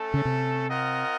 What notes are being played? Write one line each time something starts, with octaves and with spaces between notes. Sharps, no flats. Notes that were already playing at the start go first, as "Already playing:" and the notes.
Already playing: A3 C#4 A4
C#3
C3
C4 F4 A#4 D#5 F#5